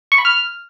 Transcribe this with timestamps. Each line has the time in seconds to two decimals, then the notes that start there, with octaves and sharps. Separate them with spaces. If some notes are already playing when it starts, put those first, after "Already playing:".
0.12 C#6
0.18 B5
0.25 F6